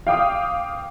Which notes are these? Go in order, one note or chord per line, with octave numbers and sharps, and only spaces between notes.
F5 G5 D6 D#6